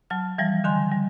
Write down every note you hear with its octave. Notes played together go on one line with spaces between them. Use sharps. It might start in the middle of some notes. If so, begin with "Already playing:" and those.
F#3 A5 F6
E3 F3 G3
D3 D#3 G#5 C6
G3